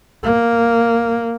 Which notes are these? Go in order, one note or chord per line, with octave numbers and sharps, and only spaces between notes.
A#3